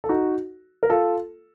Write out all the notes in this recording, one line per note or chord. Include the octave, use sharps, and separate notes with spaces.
A4
D#4 F#4
A#4
F4 A4